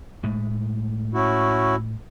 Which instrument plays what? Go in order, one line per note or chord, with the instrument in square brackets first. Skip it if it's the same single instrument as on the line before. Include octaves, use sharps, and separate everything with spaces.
[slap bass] A2 G#3 A3
[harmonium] C#4 E4 F#4